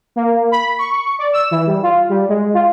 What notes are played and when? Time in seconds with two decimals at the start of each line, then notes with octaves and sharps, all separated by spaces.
0.16 A#3
0.52 B5
0.78 C#6
1.19 D5
1.33 E6
1.51 E3
1.67 G3
1.83 F4
2.09 G3
2.29 G#3
2.54 F4